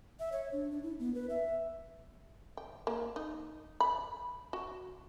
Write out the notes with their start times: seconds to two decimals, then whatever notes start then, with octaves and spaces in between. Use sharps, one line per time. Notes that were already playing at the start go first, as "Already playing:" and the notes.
0.19 E5
0.32 C#5
0.53 D4
0.71 D4
0.83 E4
0.99 B3
1.15 B4
1.30 E5
2.57 G5
2.87 A#3
3.16 D#4
3.80 B5
4.53 F#4